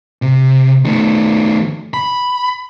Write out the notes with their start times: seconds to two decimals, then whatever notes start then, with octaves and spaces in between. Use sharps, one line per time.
0.22 C3
0.85 D#3 A3
1.94 B5